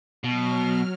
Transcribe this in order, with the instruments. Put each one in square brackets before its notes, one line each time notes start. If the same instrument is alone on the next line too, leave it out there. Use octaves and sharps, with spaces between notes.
[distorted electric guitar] B2 [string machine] F#3 F6